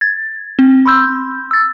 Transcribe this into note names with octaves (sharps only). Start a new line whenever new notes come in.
G#6 A6
C4
B5 C6 E6 G6
E6 A6